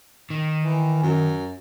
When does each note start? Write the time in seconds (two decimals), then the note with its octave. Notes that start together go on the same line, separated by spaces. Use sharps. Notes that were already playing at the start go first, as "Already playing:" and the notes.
0.30 D#3
0.62 E3
1.03 F#2